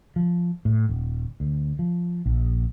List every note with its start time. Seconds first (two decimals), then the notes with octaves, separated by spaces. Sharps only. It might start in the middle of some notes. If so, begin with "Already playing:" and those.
0.16 F3
0.65 A2
0.89 D#1
1.40 D2
1.79 F3
2.26 A#1